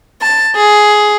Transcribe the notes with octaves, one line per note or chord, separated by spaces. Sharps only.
A5
G#4